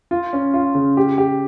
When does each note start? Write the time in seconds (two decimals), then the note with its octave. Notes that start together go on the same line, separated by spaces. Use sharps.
0.11 F4
0.33 C#4
0.54 F4
0.75 C#3
0.97 G4
1.18 G4